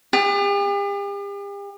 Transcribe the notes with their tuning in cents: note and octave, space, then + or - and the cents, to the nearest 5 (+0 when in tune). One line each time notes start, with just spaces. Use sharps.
G4 +45